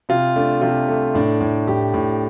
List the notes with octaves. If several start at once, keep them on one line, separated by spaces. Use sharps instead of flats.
C3 F4
A3 D4
C3 F4
A3
A2 D4
A2
A2 G4
A2